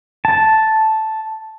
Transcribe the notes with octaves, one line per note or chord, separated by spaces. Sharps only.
A5